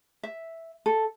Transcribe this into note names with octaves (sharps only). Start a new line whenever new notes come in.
E5
A4